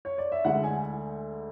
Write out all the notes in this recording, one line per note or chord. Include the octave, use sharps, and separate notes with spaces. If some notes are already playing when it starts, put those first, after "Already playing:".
C#5
D5
E5
D2 D3 G#3 F#5
G#5